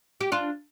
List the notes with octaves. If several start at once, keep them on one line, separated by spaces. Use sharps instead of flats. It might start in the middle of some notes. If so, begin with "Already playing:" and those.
G4
D4 F4